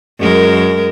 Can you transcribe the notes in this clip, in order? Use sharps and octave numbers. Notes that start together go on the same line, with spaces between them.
F#2 G#3 A#4